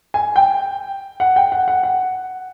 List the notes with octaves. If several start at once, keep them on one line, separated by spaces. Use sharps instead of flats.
G#5
G5
F#5
G5
F#5
F#5
F#5